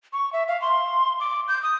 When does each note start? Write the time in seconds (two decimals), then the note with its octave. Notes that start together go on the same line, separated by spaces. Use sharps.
0.13 C#6
0.33 E5
0.48 F5
0.62 C6
1.20 D6
1.48 G6
1.63 D#6